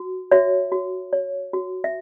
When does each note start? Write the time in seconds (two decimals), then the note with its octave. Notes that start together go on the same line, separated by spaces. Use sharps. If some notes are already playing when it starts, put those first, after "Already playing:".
Already playing: F#4
0.31 F#4 C#5 E5
0.72 F#4
1.13 C#5
1.53 F#4
1.84 E5